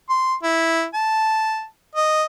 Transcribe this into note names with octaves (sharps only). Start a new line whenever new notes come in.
C6
E4
A5
D#5